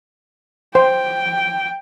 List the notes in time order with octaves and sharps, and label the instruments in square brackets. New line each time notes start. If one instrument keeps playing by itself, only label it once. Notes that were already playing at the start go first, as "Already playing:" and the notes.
[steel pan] C5 [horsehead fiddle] G5